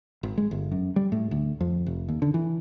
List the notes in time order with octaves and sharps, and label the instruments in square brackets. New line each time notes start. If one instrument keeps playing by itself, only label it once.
[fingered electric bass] G#1
G#3
G1
F#2
G3
A2
D2
F2
F1
D#2
D3
E3